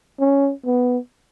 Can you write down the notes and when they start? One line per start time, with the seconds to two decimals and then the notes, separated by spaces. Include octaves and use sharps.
0.20 C#4
0.66 B3